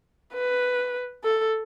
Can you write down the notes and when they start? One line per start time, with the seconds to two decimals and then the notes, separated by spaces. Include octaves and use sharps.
0.34 B4
1.24 A4